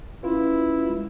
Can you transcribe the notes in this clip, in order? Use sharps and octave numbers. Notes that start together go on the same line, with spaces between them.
C#4 E4 F4 B4
G#3